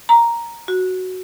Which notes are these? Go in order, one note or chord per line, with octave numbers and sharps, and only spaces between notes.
A#5
F#4